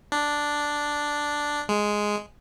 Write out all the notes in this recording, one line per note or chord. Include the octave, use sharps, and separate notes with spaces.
D4
G#3